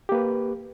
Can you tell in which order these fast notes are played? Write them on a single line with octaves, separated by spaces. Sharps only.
G4 A#3 B4